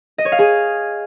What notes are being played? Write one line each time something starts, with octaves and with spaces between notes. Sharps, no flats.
D#5
C#5
F5
G#4